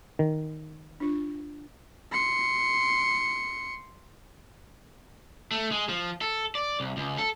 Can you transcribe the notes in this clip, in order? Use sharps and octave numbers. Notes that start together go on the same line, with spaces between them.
D#3
D4 F4
C6 C#7
A3
G#3
F3
A4
D5
C2
C#2
A4